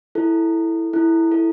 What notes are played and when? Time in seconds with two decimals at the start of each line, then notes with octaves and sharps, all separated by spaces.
0.15 E4 A4
0.93 E4 A4
1.32 E4 A4